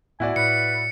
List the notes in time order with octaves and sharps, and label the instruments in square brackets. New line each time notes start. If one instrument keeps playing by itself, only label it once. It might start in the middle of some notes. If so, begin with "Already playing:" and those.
[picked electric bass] A2 A3 B3 [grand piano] E4 F#4 D5 [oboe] G#5
[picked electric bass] A2 [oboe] B4 [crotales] C#7